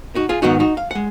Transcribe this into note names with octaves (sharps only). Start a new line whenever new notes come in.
D#4 F#4
F4 G#4
G#2 D#3 F#3 B3 D#4 F#4
D#4 F#4
F5
G#3 F#5